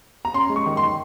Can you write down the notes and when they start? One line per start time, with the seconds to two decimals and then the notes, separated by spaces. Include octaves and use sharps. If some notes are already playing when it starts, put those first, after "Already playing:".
0.25 A#5
0.34 C#4 C6
0.50 G#3
0.56 C#6
0.66 D#3
0.77 C6
0.82 D#3